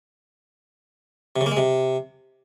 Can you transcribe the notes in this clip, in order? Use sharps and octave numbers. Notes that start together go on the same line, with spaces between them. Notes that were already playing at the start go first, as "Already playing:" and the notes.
C3
C#3
A#3
G#3
C3